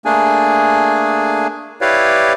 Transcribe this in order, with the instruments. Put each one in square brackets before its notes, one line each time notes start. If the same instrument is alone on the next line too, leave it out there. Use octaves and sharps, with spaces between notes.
[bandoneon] A3 A#3 D4 G#4 G#5
E4 G4 B4 C#5 D5 F5